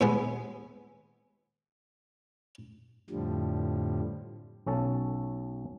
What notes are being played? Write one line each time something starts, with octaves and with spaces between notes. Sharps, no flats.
D#2 G#3 B3
F2 A2 D3 F3 G3
B1 C#4 A4